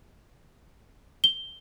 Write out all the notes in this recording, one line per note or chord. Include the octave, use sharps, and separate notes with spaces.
G7